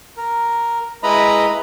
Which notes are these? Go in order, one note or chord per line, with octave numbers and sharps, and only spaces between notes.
A#4
G#3 E4 B4 D#5 A#5 B5